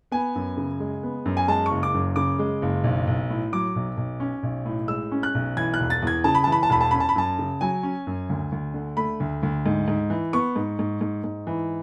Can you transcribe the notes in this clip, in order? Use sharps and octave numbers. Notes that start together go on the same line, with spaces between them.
B3 G#5
F#2
C#3
G#3
B3
F#2
G#5
G#3 A5
F#1 C#6
D6
F#2
C#3 D6
G#3
F#1
B1
B1
A2
F#3 D6
B1
B1
C#4
B1
A2
G#3 E6
C#4
F#6
B1
E3 G#6
F#6
E1
A6
E2 G#6
C#3 A5
B5
E3 A5
B5
A5
E1 B5
A5
C#4 B5
A5
B5
F#2 A5
C#3
F#3 G#5
C#4
F#2
D2
D2
D3
A3 B5
D2
D2
G#2
G#2
E3
B3 C#6
G#2
G#2
G#2
G#2
E3